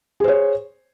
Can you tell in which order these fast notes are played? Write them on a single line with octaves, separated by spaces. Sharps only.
G#4 C5 C#5